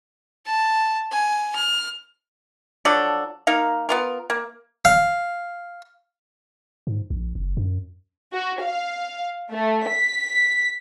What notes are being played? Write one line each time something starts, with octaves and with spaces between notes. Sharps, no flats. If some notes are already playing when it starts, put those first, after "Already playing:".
A5
G#5
F6
F3 F#3 D4 A4
A#3 D#4 A#4 F5
B3 F4 A#4
A#3
F5
G#2
A#1
F#1
F#2
F#4
F5
A3
B6